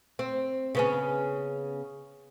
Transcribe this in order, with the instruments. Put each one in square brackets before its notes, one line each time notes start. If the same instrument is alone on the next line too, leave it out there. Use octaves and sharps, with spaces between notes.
[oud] C4
C#3 B3 C#4